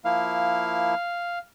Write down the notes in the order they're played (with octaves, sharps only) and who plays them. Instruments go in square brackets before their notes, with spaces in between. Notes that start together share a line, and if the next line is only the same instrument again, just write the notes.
[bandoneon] F3 A#3 E4 [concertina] F5